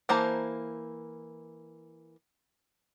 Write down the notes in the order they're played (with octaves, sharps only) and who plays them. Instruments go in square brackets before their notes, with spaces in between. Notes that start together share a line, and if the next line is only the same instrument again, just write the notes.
[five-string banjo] E3 A#3 C5 A5 A#5